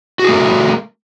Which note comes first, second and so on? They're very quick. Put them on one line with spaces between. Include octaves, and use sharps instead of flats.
F#4 G#4 A3 A#4